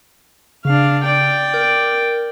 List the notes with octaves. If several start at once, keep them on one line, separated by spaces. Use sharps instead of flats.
C#3 D4 F5
D5 G5
A#4